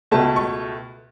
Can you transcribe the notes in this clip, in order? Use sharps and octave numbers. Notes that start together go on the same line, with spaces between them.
C#2 B2 A3 A5
C#6